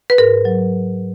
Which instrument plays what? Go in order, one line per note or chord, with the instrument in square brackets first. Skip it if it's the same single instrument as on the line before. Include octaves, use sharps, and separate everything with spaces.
[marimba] B4
G#2 A#4
F#3